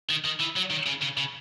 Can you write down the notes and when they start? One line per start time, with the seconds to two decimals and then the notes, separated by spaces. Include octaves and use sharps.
0.09 D#3
0.24 D#3
0.39 E3
0.56 F#3
0.70 D#3
0.87 C#3
1.02 C#3
1.17 C#3